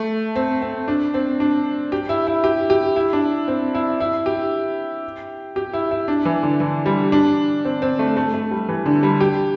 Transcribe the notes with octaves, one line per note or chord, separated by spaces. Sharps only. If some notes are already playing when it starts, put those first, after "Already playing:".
Already playing: A3
C4
C4
D4
C4
D4
G4
E4
E4
G4
G4
E4
D4
C4
E4
E4
G4
G4
E4
E4
D4
E3
D3
E3
G3
D4
C4
C4
A3
A3
A3
G3
E3
D3
G3
G4